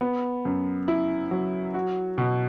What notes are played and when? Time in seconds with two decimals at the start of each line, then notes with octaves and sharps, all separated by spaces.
0.01 B3
0.45 F#2
0.88 E4
1.31 F#3
1.74 F#4
2.18 B2